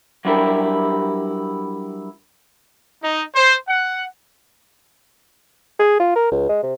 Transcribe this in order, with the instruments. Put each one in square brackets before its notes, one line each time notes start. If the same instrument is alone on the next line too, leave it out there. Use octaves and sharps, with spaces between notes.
[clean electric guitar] F#3 G3 D4 E4 G4 A#4
[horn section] D#4
C5
F#5
[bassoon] G#4
F4
A#4
C#2
G#3
C3